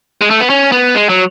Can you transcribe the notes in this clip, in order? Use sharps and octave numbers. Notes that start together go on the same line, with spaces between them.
G#3
A3
B3
C#4
B3
G#3
F#3